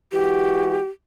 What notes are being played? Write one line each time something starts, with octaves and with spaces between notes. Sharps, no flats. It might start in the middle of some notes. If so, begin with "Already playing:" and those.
E3 G#3 F#4 G4